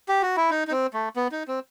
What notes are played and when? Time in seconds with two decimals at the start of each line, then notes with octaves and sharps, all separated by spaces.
0.09 G4
0.22 F#4
0.37 E4
0.51 D#4
0.68 D#4
0.71 C4
0.93 A3
1.16 B3
1.32 D#4
1.48 C4